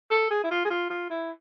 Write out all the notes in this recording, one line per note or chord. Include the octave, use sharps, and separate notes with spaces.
A4
G#4
E4
F4
G#4
F4
F4
E4